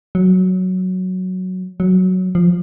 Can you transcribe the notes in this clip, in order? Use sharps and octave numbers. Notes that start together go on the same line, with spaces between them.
F#3
F#3
F3